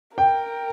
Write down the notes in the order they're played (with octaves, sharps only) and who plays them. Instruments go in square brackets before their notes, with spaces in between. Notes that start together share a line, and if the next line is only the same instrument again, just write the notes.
[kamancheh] A#4 [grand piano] G5